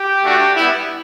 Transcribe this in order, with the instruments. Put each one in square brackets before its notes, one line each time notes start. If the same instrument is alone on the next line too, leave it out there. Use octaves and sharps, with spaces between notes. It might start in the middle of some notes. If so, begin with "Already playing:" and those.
Already playing: [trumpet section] G4
A3 D4 F#4
G3 B3 E4